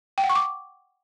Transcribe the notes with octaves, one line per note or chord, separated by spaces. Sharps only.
G5
F#5
C#6
D6